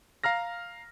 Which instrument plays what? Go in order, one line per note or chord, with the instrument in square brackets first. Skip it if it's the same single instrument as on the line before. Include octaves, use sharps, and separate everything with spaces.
[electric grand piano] F5 A#5 F6 A#6